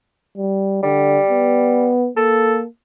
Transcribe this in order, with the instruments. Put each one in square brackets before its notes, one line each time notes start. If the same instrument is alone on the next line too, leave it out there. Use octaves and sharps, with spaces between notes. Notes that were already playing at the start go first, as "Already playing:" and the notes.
[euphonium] G3
[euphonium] D3 [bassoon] G3
[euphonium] B3
[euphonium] A#3 [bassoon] A4